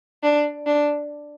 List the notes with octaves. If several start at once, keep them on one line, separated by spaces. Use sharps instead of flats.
D4
D4